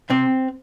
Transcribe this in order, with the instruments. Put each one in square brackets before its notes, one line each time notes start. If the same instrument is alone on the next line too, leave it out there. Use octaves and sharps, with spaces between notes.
[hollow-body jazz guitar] C3 C4